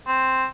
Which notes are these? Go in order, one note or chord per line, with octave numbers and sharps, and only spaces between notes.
C4